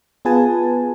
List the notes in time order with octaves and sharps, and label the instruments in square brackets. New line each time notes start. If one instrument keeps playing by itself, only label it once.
[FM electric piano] B3 F4 G#4 B4 G#5 A5